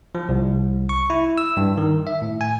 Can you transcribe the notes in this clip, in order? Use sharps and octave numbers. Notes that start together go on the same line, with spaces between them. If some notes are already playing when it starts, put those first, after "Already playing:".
F3
C2
C#6
E4
E6
G2
D#3
E5
A2
G#5